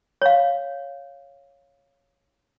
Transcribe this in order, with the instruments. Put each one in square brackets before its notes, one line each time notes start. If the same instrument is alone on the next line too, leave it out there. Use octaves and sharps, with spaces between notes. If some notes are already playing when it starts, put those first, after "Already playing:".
[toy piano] C#5 F5